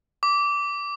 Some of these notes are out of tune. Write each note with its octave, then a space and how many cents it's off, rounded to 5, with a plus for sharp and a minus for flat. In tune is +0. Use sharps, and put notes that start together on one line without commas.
D6 -15